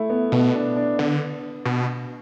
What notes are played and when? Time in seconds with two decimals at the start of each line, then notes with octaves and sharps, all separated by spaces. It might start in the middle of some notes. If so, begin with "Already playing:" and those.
Already playing: A3 E4
0.10 B3
0.32 B2 B3
0.54 D4
0.77 D4
0.99 D3 B3
1.65 B2